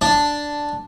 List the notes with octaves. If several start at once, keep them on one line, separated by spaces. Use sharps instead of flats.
D4